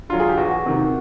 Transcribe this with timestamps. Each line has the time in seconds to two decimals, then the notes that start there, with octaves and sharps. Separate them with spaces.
0.09 D3 F#3 F4
0.20 G#4
0.29 G4
0.37 E2 F#4
0.66 C3 D#3